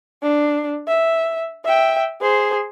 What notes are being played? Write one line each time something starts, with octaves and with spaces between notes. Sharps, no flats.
D4
E5
E5 G5
G#4 C5